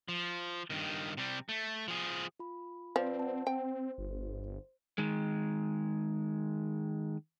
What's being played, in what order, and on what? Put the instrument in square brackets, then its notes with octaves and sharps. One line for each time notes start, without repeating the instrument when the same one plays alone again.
[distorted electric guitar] F3
G2 D#3
C3 G3
A3
F3 G#4
[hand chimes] F4 B5
[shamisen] F3 [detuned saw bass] C4 [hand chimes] B4 D5
[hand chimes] F#5 A5
[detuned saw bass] C4 [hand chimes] C5 [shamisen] G5
[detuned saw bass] G1
[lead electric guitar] D#3 G#3